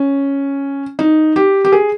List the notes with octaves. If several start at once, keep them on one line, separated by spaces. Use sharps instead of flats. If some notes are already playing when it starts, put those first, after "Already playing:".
Already playing: C#4
D#4
G4
G4
G#4